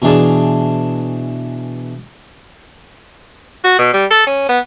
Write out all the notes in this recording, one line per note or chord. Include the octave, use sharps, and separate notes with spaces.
B2 E3 D4 G#4 A5
F#4
B2
G3
A4
C#4
B3